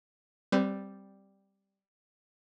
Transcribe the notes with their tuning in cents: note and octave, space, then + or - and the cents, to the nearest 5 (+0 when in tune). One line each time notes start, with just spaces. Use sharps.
G3 +0 C4 +0 B4 +35